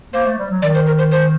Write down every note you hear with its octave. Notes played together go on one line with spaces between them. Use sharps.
A#3 C5
A3
G3
F#3
D#3 D5
C5
A#4
C5
C5